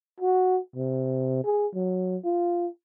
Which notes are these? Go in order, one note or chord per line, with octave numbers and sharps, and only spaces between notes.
F#4
C3
G#4
F#3
F4